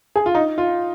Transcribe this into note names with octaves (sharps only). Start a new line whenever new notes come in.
G#4
F4
D#4
F4